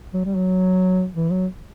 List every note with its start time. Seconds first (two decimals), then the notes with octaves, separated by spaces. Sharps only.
0.13 F#3
0.25 G3
0.36 F#3
1.15 E3
1.31 F#3